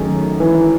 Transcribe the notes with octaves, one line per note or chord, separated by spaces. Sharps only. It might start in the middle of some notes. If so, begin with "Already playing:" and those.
Already playing: F#2 D#3 A3 C#4 G#4
E3